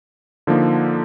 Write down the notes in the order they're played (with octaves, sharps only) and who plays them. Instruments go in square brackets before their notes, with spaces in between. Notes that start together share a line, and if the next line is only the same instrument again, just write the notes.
[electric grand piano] D3 F3 A#3 D#4